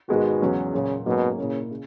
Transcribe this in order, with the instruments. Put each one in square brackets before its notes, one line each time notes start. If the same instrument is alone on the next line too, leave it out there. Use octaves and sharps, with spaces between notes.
[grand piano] G#2 D#3 G#3 B3 F#4 [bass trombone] B2
[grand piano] E2 C#3 F#3 C#4
[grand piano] A#2 F#3 A#3 [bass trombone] C#3
[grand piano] G#2 F#3 A#3 C#4 [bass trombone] B2
[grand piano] A#2 A#3 E4 [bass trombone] C#3
[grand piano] C#3